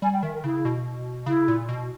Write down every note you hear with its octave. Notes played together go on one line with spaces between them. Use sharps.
G3 G#5
G5
D#3 E5
A#4
C#3 E4
B2
C#3 E4
A#2
B2